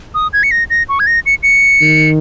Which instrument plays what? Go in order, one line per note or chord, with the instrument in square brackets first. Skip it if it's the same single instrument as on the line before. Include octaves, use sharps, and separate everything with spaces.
[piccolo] D#6
G#6
C#7
A#6
A#6
C#6
G#6
A#6
C#7
C#7
[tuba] D#3